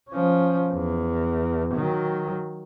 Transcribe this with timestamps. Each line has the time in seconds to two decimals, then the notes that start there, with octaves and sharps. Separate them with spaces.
0.10 F3 C#4
0.72 E2
1.74 D#3 F#3